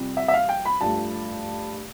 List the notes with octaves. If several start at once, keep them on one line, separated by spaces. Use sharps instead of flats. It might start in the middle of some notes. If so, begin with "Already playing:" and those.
Already playing: F2 C3 G3
E5
E5
F5
G5
B5
G2 F3 A3 A5